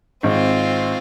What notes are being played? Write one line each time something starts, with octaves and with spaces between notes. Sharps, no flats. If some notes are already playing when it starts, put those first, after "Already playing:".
G#1 C4 F4